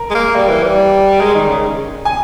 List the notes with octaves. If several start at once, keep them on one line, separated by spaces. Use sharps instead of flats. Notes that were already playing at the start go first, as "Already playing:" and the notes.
Already playing: A#4
G#3
A#3
G3
E3
G3
G#3 A#4
D#3
C#3
G#5